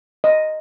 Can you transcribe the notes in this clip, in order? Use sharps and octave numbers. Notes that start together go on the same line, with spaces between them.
D#5